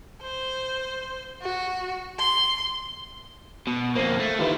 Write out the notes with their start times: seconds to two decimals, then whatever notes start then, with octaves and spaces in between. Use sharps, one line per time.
0.22 C5
1.42 F#4
2.18 C6
3.67 B2
3.95 F2 A#3 C5 C7 D#7
4.20 A3
4.39 D#3 E4 F4 G4 B4